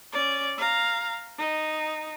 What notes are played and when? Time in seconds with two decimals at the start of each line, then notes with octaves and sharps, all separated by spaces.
0.12 C#4 D5
0.58 F5 A#5
1.38 D#4